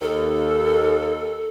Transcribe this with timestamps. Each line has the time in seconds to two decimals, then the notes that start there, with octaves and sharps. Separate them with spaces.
0.01 D#2 A4